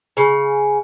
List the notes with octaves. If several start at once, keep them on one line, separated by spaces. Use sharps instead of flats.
C#3